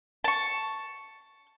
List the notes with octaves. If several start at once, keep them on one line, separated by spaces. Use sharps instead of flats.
A5 C#6